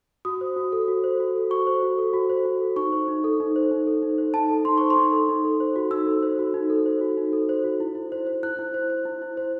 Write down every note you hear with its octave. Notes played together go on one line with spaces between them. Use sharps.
F#4 D#6
C5
F#4
A4
F#4
C5
F#4
A4
F#4 C#6
C5
F#4
A4
F#4
C5
F#4
A4
D#4 C#6
C5
D#4
A4
D#4
C5
D#4
A4
D#4
C5
D#4 A5
A4
D#4 C6
C5 C#6
C6
D#4
A4
D#4
A4
C5
F#4
D#4 E6
A4
C5
F#4
D#4
A4
C5
F#4
D#4
A4
C5
F#4
E4
E4
C5
C5
E4 F#6
E4
C5
C5
E4
E4
C5